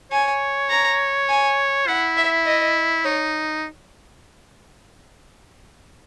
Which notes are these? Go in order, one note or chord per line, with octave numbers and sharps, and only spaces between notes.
C#5 G#5
A#5
G#5
E4 F#5
E5
D#5
D#4 C#5